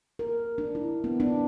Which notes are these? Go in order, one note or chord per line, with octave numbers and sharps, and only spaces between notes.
A#4
D4
E4
B3
D4